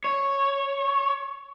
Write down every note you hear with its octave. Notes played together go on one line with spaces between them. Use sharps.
C#5